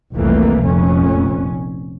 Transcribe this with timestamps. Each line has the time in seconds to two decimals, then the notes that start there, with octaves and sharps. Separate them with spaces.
0.14 F1 C2 F2 E3 A3 A#3
0.64 F1 F2 A#2 C#4